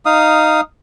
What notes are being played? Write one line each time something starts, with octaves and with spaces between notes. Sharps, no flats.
D#4 F5 D#6